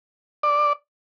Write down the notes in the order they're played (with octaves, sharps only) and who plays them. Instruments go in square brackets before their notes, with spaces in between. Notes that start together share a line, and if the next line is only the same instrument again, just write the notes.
[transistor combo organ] D5